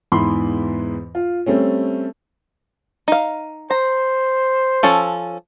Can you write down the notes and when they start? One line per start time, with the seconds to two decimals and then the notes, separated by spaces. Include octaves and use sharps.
0.12 E2 G#2 E3 B3 B5 C6
1.15 F4
1.46 G3 A3 C4 C#4
3.08 D#4 F5
3.71 C5 A#5
4.83 F3 C#4 A4